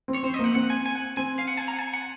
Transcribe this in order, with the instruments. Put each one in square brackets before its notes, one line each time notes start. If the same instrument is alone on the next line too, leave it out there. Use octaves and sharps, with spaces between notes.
[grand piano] C4
[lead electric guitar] C#5
[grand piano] C4 [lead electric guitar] C5
[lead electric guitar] D#5
[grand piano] A#3 [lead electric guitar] F#5
[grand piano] C4 [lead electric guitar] F#5
[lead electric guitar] G#5
G#5
F#5
[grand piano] C4 [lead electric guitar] G#5
[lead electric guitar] F5
F#5
G#5
A#5
F#5
G#5
F#5